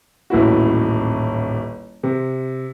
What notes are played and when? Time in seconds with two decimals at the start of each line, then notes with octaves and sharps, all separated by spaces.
0.30 D#1 A1 B3 E4 F#4
2.03 C3